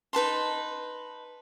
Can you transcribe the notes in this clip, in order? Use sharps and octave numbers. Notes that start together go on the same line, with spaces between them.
D#4 B4 A5 C6